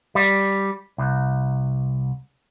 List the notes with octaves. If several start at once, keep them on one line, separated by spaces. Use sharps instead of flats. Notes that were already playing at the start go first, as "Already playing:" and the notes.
G3
C2